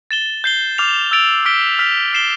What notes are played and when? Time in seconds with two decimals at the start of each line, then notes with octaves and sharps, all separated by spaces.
0.11 A6 E7 G7
0.44 G6 C7 G7
0.78 D6 F6 C7 F7
1.11 E6 A6 D7 F7
1.45 D6 F6 B6 D7 G7
1.79 F6 B6 F7
2.13 F6 C7 E7 G7